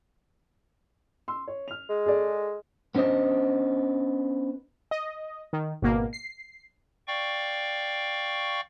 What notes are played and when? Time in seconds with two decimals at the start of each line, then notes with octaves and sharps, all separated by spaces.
1.28 C6 E6
1.48 C#5
1.68 F6 F7
1.90 G#3
2.06 G#4 A4 D5
2.95 B3 C#4 D4 C5 D#5
4.91 D#5
5.53 D#3
5.82 G#1 B2 A#3
6.13 C7
7.08 D5 F5 G5 C#6